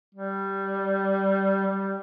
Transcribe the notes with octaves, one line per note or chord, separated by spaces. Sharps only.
G3
G3